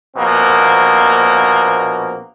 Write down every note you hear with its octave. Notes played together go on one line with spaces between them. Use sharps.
A#1 B2 A#3 C4